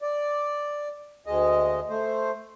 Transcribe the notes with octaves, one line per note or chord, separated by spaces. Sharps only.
D5
D2 G#3 D#5
A3 C5